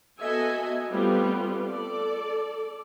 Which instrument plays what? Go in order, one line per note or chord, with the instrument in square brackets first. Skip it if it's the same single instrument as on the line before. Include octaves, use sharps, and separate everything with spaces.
[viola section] B3 F#4 A4 D#5 E5 G#5
G3 A3 B3 C4 F4
A4 D5